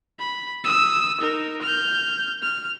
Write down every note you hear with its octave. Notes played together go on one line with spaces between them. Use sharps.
B5
D#6 E6
D#4 A#4
F6 G6
F6